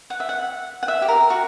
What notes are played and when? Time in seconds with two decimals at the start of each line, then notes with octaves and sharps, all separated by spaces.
0.10 F#5
0.20 E5
0.29 F#5
0.83 F#5
0.88 E5
1.02 G4
1.08 A#4
1.30 F#4